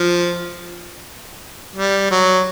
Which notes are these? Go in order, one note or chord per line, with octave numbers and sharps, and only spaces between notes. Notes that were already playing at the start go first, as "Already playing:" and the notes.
Already playing: F3
G3
F#3